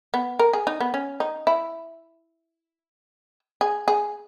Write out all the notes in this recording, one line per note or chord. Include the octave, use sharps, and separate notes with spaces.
B3
A#4
G#4
D#4
B3
C#4
D#4
E4
G#4
G#4